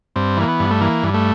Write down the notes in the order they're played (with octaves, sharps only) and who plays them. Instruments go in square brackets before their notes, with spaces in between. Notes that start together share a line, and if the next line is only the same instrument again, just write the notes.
[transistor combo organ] G2 C4
E3 A#3
B3
G2
A3
E3 A#3
G2
A3